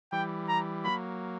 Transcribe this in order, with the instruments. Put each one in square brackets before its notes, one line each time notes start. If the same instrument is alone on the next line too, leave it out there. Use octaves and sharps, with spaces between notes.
[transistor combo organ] E3 G3 [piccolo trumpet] G5
[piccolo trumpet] A#5
[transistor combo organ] F#3 A#3 [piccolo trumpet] B5